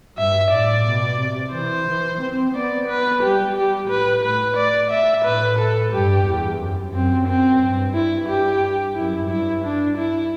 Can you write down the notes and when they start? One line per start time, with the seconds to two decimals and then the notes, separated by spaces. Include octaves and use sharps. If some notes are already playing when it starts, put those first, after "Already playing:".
0.18 G2 E5
0.51 A2 D5
0.86 B2
1.19 C3
1.53 E3 C5
1.87 E3
2.20 C4
2.54 B3 D5
2.88 B4
3.22 G3 G4
3.56 G4
3.90 A2 B4
4.23 A2 B4
4.57 A2 D5
4.91 E5
5.24 A2 B4
5.59 A4
5.93 G2 G4
6.26 E2
6.60 F#2
6.93 F#2 C4
7.28 C4
7.61 G2
7.94 E4
8.29 G4
8.96 F#2 E4
9.30 G2 E4
9.64 D4
9.97 E4